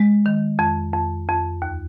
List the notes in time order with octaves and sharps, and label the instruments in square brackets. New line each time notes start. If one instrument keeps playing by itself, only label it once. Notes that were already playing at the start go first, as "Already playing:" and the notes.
Already playing: [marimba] G#3
D#3
F2
F2
F2
D#2